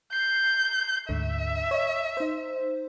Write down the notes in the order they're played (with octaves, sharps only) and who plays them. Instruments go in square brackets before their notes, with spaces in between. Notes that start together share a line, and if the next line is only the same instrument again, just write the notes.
[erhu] G6 [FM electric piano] C7
[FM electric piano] D2 G#2 D3 [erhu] E5
[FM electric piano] C#5 D#5
D#4 C5